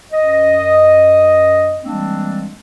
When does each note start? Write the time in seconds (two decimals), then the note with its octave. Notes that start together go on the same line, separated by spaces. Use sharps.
0.12 F#2 D#5
1.84 E3 G3 G#3 A#3 C4 D4